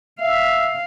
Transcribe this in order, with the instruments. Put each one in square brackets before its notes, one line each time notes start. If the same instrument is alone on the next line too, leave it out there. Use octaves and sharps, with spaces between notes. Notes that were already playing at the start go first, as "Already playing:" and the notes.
[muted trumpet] E5 [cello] F5